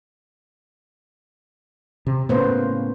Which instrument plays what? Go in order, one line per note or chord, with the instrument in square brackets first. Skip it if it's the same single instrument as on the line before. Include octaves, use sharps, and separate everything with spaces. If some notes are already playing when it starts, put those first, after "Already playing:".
[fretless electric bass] C3
[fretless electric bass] A2 C#3 A#3 [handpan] B3 B4 C5